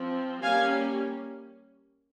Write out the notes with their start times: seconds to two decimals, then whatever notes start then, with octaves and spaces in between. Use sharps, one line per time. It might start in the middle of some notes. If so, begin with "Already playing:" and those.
Already playing: F3 C4
0.42 G3 A#3 C#4 F5 G#5